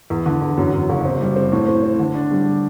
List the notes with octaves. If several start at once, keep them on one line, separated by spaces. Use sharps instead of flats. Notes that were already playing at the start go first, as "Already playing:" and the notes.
E2
D3
E2
F#2
F#2
F#1
C4
G3
C4
A2
C4
C4
D3
D4
G3